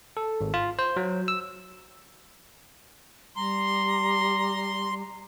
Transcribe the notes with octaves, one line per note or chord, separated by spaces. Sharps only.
A4
G#1
F4
C5
F#3
E6
G3 A#5 C6